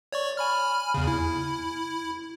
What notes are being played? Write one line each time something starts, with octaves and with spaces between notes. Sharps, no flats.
C#5 D5 C#6
G#5 B5 F6
E2 C#3
E4